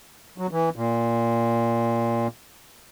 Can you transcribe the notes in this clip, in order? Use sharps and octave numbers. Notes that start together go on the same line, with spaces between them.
F#3
E3
A#2